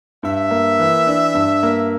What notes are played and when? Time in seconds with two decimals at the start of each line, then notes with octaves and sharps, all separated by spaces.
0.23 G2 E5
0.51 A#3
0.79 E3
1.07 D4
1.35 G2
1.63 A#3